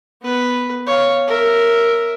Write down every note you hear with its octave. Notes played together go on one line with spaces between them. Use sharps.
B3 B4
C#5 F5
A#4 E5